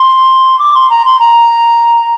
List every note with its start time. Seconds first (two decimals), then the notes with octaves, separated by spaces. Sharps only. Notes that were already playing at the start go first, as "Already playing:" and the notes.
Already playing: C6
0.59 D6
0.74 C6
0.90 A#5
1.05 C6
1.19 A#5